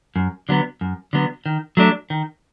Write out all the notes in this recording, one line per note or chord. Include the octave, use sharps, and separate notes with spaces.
F#2
D3 F#3 B3
F#2
D3 F#3 B3
D#3
F#3 A3 D4
D#3